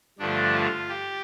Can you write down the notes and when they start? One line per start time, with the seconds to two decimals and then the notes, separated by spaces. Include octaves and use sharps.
0.19 G2 D3 F3 A3 D4
0.54 F4
0.89 G4